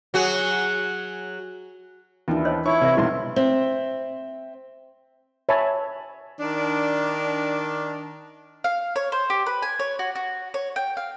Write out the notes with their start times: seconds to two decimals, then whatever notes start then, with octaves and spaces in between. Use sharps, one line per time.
0.14 F#3 F#4 G#4
2.28 D#2 E3 D4 E4 F4
2.45 C5 C#5 D#5
2.66 D#4 E4 C#5 C#6
2.81 C3 C4 B4 E5
2.97 F1 B1 E4 C6
3.36 C4 E5
5.49 C#5 E5 G#5 A5 B5
6.39 D#3 D4
8.64 F5
8.96 C#5
9.12 C5
9.30 G4
9.46 B4
9.62 G#5
9.79 C#5
9.99 F#4
10.15 F#4
10.54 C#5
10.76 G5
10.97 F5